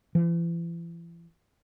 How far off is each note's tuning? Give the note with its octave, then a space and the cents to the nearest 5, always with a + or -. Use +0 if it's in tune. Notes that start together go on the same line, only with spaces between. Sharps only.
E3 +40